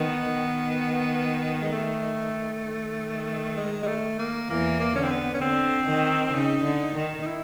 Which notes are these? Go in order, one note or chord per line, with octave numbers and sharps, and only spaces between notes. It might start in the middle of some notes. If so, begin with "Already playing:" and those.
Already playing: D#3 B3
D#3
G#3
A3
D#3
G#3
G#3
A3
A#3
E2 E3 A#3
A#3
D3 C#4
C4
B3
C#4
D3 C4
D#3
C#3 D#4
D3
D#3
D#4
E4